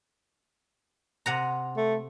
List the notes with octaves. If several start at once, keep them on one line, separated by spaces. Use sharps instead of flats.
C3 F#5 A#5
A3